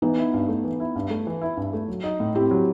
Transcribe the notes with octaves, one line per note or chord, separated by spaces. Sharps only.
E3 B3 D#4
E4
G2
A3
E3
E4
G2
A3
E3
E4
G2
A3
F#3
D#4
A2
C4 E4 G4
F#3